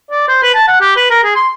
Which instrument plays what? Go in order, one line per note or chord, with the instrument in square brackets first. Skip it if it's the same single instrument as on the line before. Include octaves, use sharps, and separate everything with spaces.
[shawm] D5
C5
B4
A5
F#5
G4
B4
A#4
G#4
C6